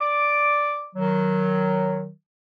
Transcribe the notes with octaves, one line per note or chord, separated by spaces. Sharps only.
D5 D6
D#3 F#3